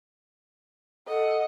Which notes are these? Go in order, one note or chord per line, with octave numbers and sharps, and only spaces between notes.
A4 D#5 F#5